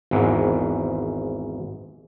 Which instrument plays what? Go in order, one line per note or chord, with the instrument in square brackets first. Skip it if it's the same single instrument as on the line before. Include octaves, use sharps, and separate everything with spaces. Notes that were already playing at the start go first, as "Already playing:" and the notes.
[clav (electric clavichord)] G#1 E2 G#2